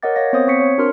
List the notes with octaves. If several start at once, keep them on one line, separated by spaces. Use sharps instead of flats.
A#4 C#5 D#5 F#5 D6 A6
C#5 F5 A#6
B3 C4 C5 C#5 F5 D#6
C4 C#6 B6 C#7
C#5
D4 F#4 A#4 C5 C6 F6